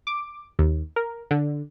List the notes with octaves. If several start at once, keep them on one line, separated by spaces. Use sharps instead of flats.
D6
D#2
A#4
D3